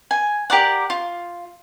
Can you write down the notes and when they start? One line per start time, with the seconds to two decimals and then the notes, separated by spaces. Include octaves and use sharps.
0.11 G#5
0.50 G4 A#4 D5 F#5
0.90 F4